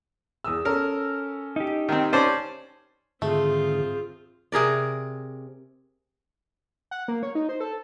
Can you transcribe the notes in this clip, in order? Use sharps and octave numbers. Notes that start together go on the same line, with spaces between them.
E2 D#6 E6
C#4 A4 A#4
D#4 G4
D#3 C4
C#4 C5 D5 A5 A6
G#2 D3 D#3 A3 C4 F4 G#4
C3 G#4 A#4 D5
F#5
A#3
C#5
D#4
C5
A4